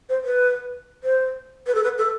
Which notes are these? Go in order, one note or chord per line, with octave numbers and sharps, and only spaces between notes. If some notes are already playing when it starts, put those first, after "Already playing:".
C5
B4
C5
B4
A4
B4
A4